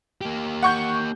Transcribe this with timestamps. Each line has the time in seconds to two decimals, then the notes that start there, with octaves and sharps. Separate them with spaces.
0.21 A#3 G4
0.62 F#5 C#6 G6